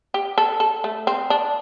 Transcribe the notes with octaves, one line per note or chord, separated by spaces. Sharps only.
G4
A4
A4
A3
C4
D4